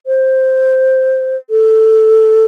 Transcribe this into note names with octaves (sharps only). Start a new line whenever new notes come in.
C5
A4